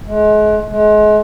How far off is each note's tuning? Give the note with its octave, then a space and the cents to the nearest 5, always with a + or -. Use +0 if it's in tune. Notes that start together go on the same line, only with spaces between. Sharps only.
G#3 +35
G#3 +35